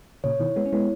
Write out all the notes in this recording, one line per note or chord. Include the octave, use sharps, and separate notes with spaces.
A#2 C#3 C#5
B2 D#3 E4
G#3 B3 C#5
C#4
G#3 B3 E4